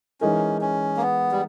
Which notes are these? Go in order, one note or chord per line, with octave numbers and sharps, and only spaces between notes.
E3 G#3 C#4 D#4 A#4
C#4
A#3
B3
G3